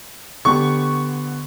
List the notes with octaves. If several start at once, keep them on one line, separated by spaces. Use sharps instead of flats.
D3 B3 G4 C#6